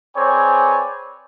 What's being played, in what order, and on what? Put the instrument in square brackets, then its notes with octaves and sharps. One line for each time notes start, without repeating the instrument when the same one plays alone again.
[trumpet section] C4 G#4 B4 C#5 D5 G#5